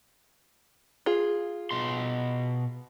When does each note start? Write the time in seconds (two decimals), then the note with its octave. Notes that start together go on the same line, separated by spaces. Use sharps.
1.06 F4 G#4
1.71 B2 C6